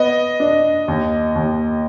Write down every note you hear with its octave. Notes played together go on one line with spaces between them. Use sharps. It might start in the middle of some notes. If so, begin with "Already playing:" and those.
Already playing: B3 D#5
D4
D#2
D#2